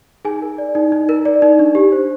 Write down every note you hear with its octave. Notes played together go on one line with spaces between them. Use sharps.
D#4 G#4 G#5
A#4
D5
D#4
D#4
A#4
D5
D#4
D4
G4
C5